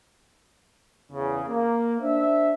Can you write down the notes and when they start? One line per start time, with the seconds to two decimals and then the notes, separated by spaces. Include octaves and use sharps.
1.12 E2 C#3
1.48 A#3
2.02 D4 C5 E5